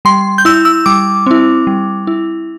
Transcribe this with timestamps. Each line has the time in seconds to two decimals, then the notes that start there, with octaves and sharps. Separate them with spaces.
0.05 G3 C6
0.38 G6
0.45 E4 E6
0.65 E6
0.86 G3 D6
1.26 C4 E4
1.67 G3
2.07 E4